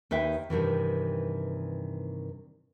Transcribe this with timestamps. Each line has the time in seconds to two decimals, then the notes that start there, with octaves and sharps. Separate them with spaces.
0.11 D#2 D#4 B4 E5 G5
0.50 G2 C3 D#3 E3